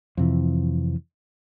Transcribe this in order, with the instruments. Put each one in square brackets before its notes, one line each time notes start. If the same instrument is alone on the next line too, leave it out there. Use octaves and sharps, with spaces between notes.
[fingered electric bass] F2 C3 E3